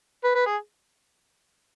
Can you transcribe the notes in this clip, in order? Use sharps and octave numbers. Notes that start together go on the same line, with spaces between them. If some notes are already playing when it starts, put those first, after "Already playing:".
B4
B4
G#4